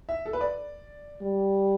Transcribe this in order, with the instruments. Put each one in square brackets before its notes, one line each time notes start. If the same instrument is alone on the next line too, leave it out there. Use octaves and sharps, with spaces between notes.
[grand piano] E5
A4
B4
D5
[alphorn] G3